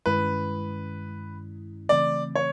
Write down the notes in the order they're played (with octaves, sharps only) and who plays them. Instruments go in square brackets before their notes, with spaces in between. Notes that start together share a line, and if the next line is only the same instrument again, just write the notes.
[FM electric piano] G2 D#3 G#3 C#4 E4 [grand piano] B4
[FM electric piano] C#3 E3 A3 C4 [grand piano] D5
[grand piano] C#5